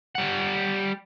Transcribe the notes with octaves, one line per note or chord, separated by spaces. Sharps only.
G3 F#5